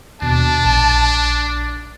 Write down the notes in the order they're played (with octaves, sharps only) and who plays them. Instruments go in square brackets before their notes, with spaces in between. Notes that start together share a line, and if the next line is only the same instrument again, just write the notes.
[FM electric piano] D#2 B2 [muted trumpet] D4 [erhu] A5
[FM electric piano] A#1